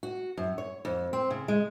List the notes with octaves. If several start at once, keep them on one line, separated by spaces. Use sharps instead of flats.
F#4
F#2
C#5
F2
C4
C#3
G#3